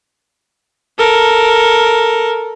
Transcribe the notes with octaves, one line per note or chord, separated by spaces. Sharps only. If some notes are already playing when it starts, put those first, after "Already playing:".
A4 A#4